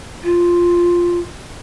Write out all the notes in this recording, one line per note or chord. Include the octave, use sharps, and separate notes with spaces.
F4